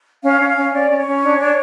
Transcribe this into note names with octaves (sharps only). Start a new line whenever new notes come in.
C#4 F5
C#4
F5
C#4
C#4 D5
C#4
C#5
C#4
D4
D4